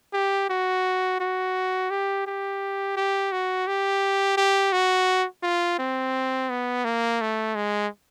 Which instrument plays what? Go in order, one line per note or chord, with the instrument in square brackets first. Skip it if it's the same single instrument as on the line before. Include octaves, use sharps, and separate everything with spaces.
[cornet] G4
F#4
F#4
G4
G4
G4
F#4
G4
G4
F#4
F4
C4
B3
A#3
A3
G#3